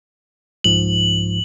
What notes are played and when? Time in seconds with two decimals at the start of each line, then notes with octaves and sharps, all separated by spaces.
0.64 C2 G#2 F3 F#7